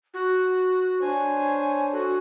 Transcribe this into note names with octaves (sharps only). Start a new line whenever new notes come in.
F#4
D4 C5 C#5 G#5
F#4 A4